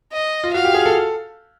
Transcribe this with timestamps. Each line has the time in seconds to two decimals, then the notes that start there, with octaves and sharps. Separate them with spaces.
0.13 D#5
0.44 F4
0.54 F#4 F5
0.65 G4
0.74 G#4
0.86 A4